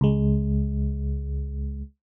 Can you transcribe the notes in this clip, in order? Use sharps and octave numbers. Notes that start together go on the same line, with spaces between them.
C#2 G#3